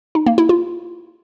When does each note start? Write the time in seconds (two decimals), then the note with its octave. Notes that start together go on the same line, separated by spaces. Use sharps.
0.15 D#4
0.26 A#3
0.38 E4
0.49 F4